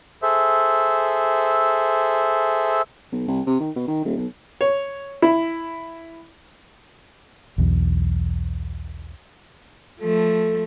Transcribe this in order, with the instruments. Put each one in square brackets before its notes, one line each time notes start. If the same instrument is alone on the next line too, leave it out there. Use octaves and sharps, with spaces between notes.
[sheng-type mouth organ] G#4 A4 C5 E5
[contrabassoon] B1
C2
C3
D#3
B2
D#3
D#1
B1
[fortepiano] C#5
E4
[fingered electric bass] B1 E2
[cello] F3 A3 [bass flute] A4